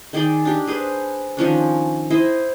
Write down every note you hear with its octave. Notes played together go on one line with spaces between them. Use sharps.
D#3 G#4 D5 G5
D4 G4
G#4 B4 C5
D#3 F3 C#4 D4
E4 C5 D#5